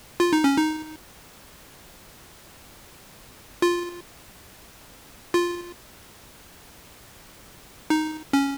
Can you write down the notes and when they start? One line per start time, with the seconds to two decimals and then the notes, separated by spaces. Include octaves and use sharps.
0.20 F4
0.33 D#4
0.44 C#4
0.57 D#4
3.62 F4
5.34 F4
7.90 D#4
8.33 C#4